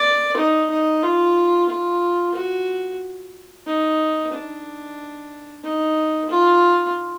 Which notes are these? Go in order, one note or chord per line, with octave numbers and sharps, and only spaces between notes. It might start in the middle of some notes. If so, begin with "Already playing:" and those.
Already playing: D5
D#4
D#4
F4
F4
F#4
D#4
D4
D#4
F4